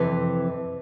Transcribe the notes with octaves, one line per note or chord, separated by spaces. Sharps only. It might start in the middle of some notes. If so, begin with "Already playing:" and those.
Already playing: F2 C3 E3